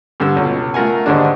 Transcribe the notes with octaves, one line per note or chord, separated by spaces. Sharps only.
G2 D3 A4 E6
C#2 B2
A3 F4 A#4 F#5 G#5
D#2 G#2 D3 G#3 D4